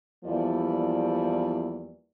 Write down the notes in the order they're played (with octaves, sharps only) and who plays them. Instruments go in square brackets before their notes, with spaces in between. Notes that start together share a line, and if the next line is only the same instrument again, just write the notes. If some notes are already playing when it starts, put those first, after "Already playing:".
[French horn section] E2 F3 G3 A#3 E4 D5